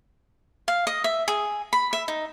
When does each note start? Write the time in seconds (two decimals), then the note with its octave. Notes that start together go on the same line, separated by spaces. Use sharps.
0.68 F5
0.87 D#5
1.04 E5
1.28 G#4
1.73 B5
1.93 E5
2.08 D#4